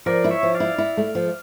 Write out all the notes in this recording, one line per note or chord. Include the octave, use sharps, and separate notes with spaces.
F3 A#4 D5
E4
C#5 E5
F3
D5 F5
E4
E4
A3
F3